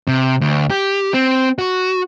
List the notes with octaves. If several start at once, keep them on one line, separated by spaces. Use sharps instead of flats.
C3
D2
G4
C4
F#4